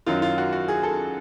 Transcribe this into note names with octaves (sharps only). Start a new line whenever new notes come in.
F#2 D#3 F#3 F4
F4
F#4
F#4
G#4
A4